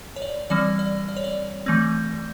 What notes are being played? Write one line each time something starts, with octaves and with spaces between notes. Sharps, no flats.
C#5
D5
E3 G3 C4 D5
D5
D5
C#5
D5
E3 A3 C4